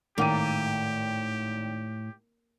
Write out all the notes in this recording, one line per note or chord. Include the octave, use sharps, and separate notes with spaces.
G#1 A2 A#3 G4 G5 D#7